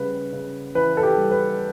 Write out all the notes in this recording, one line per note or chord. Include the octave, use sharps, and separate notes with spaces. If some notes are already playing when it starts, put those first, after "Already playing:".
Already playing: C#3 G3 B4
C#3
E3 B4
A4
G4
G3
B4